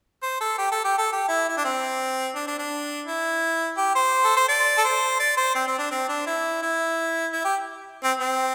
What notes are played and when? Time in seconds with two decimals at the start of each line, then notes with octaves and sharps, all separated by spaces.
0.23 C5
0.41 A4
0.58 G4
0.72 A4
0.85 G4
0.98 A4
1.12 G4
1.28 E4
1.49 E4
1.57 D4
1.65 C4
2.35 D4
2.47 D4
2.59 D4
3.06 E4
3.77 G4
3.95 C5
4.24 A4
4.37 C5
4.48 D5
4.78 A4
4.85 C5
5.19 D5
5.37 C5
5.55 C4
5.67 C4
5.79 D4
5.91 C4
6.09 D4
6.27 E4
6.63 E4
7.33 E4
7.45 G4
8.04 C4
8.20 C4